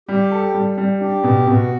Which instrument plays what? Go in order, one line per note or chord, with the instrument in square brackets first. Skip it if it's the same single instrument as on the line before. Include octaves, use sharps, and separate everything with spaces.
[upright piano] G3 [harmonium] G4
[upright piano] A4
G3
G3
[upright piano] D4 [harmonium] G4
[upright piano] B2
[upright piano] B2 [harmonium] F#4